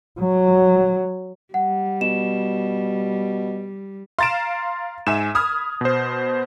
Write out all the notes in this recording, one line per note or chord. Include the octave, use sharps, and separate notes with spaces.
F#3
G3 F#5
B2 E7
F5 A#5 C6 A6 D7 E7
G#2 E5 G#5 E7
B5 D#6 F6 G#6
B2 C5